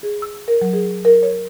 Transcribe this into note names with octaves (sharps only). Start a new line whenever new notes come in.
G#4
E6
A#4
F#3
G#4
A#4
C#5